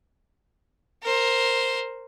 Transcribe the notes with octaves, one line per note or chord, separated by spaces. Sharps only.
A#4 C5